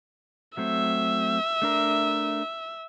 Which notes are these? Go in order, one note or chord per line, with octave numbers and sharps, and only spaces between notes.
F#3 A3 C4 E5
A3 D4 A#4